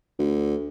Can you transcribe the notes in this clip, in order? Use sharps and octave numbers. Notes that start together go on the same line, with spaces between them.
D2